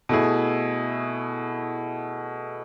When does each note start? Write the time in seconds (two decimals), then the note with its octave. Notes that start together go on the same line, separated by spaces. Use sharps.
0.09 B2 A3 E4 G#4